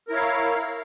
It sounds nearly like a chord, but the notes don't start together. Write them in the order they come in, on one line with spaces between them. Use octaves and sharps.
A#4 E4 C#5 F5